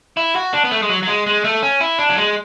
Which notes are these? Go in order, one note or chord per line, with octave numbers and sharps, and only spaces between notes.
E4
F#4
D4
B3
A3
G#3
F#3
F#3
G#3
G#3
A3
C#4
E4
D4
F#3
G#3